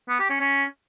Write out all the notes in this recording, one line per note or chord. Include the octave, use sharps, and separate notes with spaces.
B3
G4
C#4
C#4